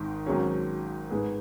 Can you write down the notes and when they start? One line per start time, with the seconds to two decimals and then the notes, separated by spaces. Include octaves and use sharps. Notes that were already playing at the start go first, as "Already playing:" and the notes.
Already playing: G#1 G#2 D#3
0.26 G#1 G#2 F#3 C#4 G#4
1.11 G#2 G#3 B3 G#4